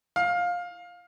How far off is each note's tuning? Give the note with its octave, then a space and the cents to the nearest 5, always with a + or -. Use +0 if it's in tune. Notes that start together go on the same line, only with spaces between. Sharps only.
F5 +15